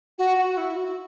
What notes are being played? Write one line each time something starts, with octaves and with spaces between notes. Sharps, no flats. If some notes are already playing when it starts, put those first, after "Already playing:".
F#4
F#4
E4
F#4